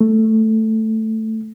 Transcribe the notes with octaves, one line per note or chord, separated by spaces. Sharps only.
A3